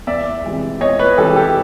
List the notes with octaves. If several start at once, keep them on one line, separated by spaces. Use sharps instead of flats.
E2 D5 E5
C3 E3 G#3
E2 C#5 D#5
B4 C#5
C3 E3 G#3 G4 A4
G4 A4